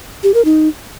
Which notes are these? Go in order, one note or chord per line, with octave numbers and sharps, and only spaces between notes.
G4
A#4
D#4